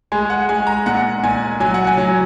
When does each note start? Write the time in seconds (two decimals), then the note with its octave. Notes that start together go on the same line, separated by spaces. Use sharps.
0.12 G#3 G#5
0.30 F#5
0.49 G#3 G#5
0.67 A#5
0.86 A#2 F#5
1.23 A#2 G#5
1.60 F#3 G#5
1.74 F#5
1.87 G#5
1.97 F#3